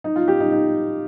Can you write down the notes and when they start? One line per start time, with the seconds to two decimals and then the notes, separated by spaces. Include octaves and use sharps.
0.04 D#4
0.16 F4
0.28 G4
0.40 D#4
0.51 D#4